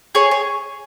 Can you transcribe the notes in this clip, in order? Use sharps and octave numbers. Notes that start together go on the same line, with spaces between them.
G#4 C#5
C#5